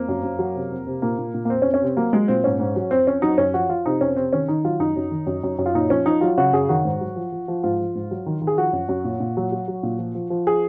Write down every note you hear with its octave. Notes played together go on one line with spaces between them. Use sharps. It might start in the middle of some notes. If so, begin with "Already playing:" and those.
Already playing: F2 A#3
F#2
F#2
F#3
C3
F2
C3
A#2 A#3
A#2
A#2
A#3
F2 C4
C#4
F2
C#4
C3 C4
F#3 A#3
F#3 G#3
A#2 C4
G#2 C#4
G#2
F#3
F2 C4
F2 C#4
F#3 D#4
F#2 C#4
F3 F#4
F3 F4
C3 D#4
F2 C#4
C3 C4
D#3 C#4
D#3 D#4
F#3 F4
F#2 D#4
F#2
D#3
F#2
F#2
F#2
F4
A#2 D#4
F3 C#4
F3 D#4
F#3 F4
C#3 F#4
F#2 G#4
D#3 F#4
G#2
F#3
F3
F3
F3
G#2 F4
F3
G#2
F#3
D#3
D#3
G#4
F3 F#4
F#2
F#2
A#2
A#2
F#3
F#3
F#3
A#2
F3
F3
F3
G#4